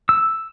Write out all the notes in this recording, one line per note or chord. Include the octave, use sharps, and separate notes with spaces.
E6